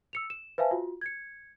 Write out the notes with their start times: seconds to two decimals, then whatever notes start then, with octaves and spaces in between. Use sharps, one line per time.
0.13 E6 C#7 F7
0.30 E7
0.58 B4 C5 E5 F5 G#5 A5
0.71 F4 F#4
1.01 G#6 C#7